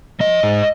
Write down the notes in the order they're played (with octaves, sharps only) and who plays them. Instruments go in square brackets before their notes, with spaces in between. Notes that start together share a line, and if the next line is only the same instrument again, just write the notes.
[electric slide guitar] F3 D#5
G#2